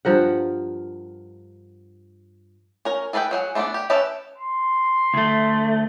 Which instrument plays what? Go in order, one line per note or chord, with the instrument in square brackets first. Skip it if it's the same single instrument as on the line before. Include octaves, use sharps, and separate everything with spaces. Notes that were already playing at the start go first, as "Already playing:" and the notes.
[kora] G2 F3 A#4 F#5
[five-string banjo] C#4 A#4
G#4 A4 B4 F5 G5
F#3 G#4 F#5
A3 B3 D4 G#4 D5
G4
C#4 G4 B4 E5 A5
[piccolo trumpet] C6
[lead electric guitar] D2 A3